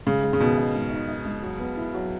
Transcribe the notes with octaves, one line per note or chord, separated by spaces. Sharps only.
G#2 C#3
G#3
C#3
B2 D#3
D#4
G#2
D#4
D#4
G#2
F#3
B3
E4
F#3